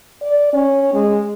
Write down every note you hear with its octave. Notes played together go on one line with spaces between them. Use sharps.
D5
C#4
G#3